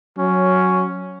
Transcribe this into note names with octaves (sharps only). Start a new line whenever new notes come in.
F#3 C#4